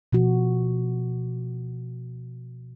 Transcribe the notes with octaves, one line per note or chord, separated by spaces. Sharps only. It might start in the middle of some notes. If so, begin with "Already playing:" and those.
B2 F3 F#4